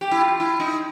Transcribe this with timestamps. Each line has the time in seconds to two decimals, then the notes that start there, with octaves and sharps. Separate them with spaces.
0.01 G4
0.11 E4
0.21 F4
0.40 E4
0.60 D#4